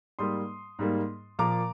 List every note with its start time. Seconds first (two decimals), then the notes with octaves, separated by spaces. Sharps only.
0.19 G#2 G3 A#3 C6 D#6
0.79 G#2 G3 A#3
1.39 A#2 F3 A#3 A#5 D6